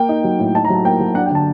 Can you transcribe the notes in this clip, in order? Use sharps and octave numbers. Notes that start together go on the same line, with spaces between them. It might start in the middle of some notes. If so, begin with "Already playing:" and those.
Already playing: A#3 G5
D#4
F#3
A2
D#4 A5
A#5
F#3 A5
A#3 G5
F#3
D4 F#5
G5
D3
A5